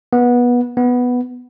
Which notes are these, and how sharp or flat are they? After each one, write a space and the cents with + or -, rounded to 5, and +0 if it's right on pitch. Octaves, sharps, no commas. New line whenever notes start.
B3 -20
B3 +0